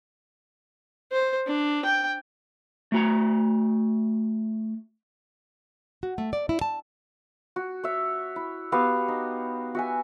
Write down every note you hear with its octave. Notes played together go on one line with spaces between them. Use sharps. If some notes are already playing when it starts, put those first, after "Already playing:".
C5
D4
G5
A3 F#4 A#5
F#4
A3
D5
E4
A5
F#4
C#5 E5
E4
B3 F#4 G4 F5
D#4
F#4 E5 G#5